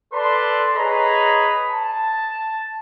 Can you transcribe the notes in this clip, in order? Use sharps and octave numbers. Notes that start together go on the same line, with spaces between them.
A4 B4 D5 A5 C6
G#4 B4 C#5 D#5 A#5 B5
A5